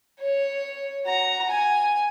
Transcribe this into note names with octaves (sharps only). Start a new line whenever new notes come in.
C#5
F#4 A#5
G#5